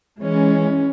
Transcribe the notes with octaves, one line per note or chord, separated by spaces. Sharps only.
E3 G#3 C#4